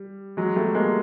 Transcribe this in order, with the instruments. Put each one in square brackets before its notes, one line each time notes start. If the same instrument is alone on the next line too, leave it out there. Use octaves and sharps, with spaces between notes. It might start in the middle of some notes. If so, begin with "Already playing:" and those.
Already playing: [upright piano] G3
F#3 G#3
G3 A3
G#3 A#3